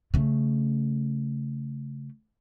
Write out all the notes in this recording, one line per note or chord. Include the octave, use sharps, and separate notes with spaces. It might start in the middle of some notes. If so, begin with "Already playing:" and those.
C#3 A3